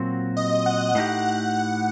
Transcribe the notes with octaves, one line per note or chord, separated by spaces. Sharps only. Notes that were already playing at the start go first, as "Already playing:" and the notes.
Already playing: A#2 F#3 C4 F#4
D#5
F#5
A2 A3 D#4 G4 F#5
F#5
F#5